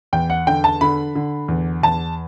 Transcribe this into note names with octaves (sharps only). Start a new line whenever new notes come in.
E2 G5
F#5
D3 G5
A5
D3 B5
D3
E2
E2 A5